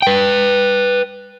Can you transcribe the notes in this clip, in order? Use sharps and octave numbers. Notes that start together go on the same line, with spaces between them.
B4 G5